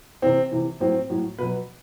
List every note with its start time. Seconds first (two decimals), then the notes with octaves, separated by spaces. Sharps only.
0.22 C3 E3 C4
0.51 C3 E3
0.80 A2 F#3 C4
1.10 A2 F#3
1.38 B2 B4
1.43 F#3